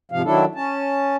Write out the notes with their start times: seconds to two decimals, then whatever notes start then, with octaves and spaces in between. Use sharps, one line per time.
0.12 G#2 C3 F3 F5
0.24 D#3 F#3 D4 E4 A4
0.55 C#4 A5